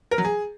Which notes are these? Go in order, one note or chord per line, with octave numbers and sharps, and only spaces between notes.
A#4
F#3
G#4